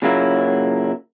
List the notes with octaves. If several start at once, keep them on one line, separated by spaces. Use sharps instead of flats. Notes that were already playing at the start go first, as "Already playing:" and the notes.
A#2 C#3 F#3 A#3 E4